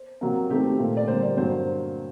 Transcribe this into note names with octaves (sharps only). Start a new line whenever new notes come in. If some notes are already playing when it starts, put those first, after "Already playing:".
Already playing: C5
C3 F#3 A#3
C3 D#3 A3 C4 G4
A#2 A3 C4
D5
D3 G3 A#3 C5
D5
G2 F#3 A#3 C5